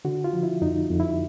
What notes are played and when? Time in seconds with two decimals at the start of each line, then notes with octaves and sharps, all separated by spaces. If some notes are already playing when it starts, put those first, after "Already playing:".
0.05 D3 F#4
0.24 F4
0.33 F3
0.43 E4
0.62 F2 D#4
0.90 F2
1.00 E4